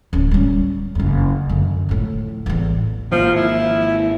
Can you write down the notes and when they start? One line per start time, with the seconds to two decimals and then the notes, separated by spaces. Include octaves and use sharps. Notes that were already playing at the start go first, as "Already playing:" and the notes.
0.13 D1 C#4
0.31 G3 C#4
0.95 F#1 F2
1.49 F#2 D3
1.89 A2 F3
2.46 A1 E2
3.12 G#1 F3 A#3
3.36 E4